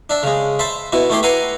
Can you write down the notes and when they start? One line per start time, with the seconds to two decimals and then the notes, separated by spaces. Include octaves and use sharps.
0.10 D4 E5
0.23 C#3 G#3
0.59 C5 E5 A5 B5
0.92 B2 E4 F#4
1.10 A3 E4 G4 C6
1.23 B4 E5 F#5 G#5 A#5 C6